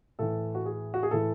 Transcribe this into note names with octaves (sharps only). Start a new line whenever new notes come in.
A2 E3 A4
F#4
G#4
F#4
G#4
A2 E3 A4